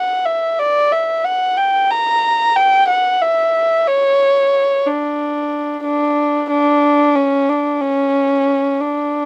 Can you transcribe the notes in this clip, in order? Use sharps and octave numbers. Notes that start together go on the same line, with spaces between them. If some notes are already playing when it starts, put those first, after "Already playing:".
Already playing: F#5
E5
D5
E5
F#5
G5
A#5
G5
F#5
E5
C#5
D4
D4
D4
C#4
D4
C#4
D4